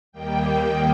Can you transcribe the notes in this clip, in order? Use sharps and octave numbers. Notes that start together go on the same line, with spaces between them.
D#2 D#3 G3 A#3 G5